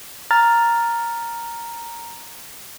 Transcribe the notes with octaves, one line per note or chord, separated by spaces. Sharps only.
A#5 F6 A6